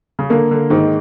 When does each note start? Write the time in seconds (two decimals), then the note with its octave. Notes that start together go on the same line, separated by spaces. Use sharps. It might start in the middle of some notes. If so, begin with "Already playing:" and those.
0.19 C#3
0.30 D3 A#3
0.51 D3
0.70 G#2 D#3